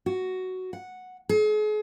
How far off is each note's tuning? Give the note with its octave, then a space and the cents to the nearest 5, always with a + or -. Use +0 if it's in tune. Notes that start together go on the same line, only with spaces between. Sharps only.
F#4 +5
F#5 -5
G#4 +40